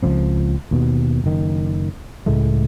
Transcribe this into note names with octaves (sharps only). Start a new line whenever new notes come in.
C#2 F3 C4
D#2 B2
F#1 D#3
C#2 A2 G#3 A3